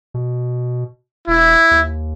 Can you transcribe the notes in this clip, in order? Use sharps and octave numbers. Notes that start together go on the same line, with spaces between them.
B2
E1 E4
D#2